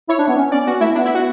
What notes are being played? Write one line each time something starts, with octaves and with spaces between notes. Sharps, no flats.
E4 C#5
D4
B3
C#4
C#4 D5
B3 F#4
A3 E4
B3 D4
E4
F#4